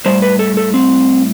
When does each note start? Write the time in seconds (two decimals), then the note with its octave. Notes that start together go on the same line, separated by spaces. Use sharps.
0.06 A2 G3 C5
0.22 B4
0.39 A4
0.57 A4
0.74 C4